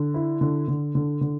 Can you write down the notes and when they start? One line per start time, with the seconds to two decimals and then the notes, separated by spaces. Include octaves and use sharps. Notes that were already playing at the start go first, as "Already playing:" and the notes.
Already playing: D3
0.14 E4
0.41 D3
0.68 D3
0.95 D3
1.21 D3